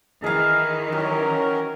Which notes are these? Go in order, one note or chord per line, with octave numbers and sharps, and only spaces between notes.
D#3 E3 G#4 A#4 F5
F#3 C#4 G4 A#4